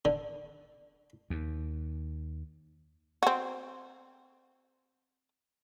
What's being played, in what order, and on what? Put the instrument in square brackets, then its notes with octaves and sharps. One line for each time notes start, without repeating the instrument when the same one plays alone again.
[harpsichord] D3
[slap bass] D#2
[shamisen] C4 F#4